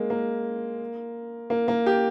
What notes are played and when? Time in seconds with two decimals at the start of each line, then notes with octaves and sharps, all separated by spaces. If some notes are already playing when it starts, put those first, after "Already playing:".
Already playing: G#3 A#3
0.10 A#3
1.50 A#3
1.68 A#3
1.86 G4